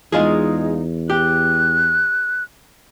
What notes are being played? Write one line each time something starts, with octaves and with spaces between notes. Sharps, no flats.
E2 G#3 D#4 F4 G#4
G4 F#6